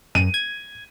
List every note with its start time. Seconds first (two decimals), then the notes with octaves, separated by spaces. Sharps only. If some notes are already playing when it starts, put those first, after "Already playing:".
0.15 F#2 D#7
0.34 G#6